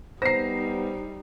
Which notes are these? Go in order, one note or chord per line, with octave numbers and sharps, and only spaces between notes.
G3 B3 D#4 C5 A#5 A#6 C7